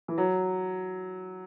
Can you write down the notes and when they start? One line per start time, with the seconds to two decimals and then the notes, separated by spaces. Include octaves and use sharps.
0.08 E3
0.18 F#3